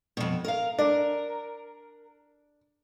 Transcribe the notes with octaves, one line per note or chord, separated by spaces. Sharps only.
F2 B2
A#4 F5
D4 A#4